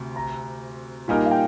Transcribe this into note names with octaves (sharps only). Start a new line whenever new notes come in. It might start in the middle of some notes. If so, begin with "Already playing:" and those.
Already playing: D2 C3
A#5
A#2 G3 A#3 D#4 A#4 G#5
F5
G5